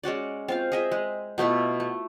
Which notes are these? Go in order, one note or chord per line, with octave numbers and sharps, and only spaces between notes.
G#3 C#4 F#4 D5
C4 F4 F5
G#4 D#5 E5
G#3
B2 A3 E4 F4
A3